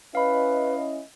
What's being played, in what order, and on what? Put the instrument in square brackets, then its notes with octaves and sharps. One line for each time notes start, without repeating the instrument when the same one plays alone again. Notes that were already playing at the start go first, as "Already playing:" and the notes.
[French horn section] C#4 E4 D#5 [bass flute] B4 [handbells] F5 B5